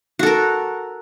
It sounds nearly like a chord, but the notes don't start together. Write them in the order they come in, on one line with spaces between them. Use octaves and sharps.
F#4 A4 A#4